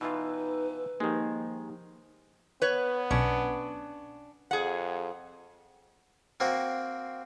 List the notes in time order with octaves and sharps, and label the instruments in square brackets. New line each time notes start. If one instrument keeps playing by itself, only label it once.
[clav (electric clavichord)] B2 E3 F4 [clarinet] D#4 [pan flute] B4 [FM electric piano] E6
[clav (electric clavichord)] D#3 G#3 [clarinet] F3 [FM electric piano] A#3 D#4 G4
[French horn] B3 [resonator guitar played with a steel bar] B4 C#5
[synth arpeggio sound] B1 B2 [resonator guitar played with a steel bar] C#4 D4
[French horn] F2 [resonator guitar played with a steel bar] G#4 F#5
[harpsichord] A#3 C4 F#4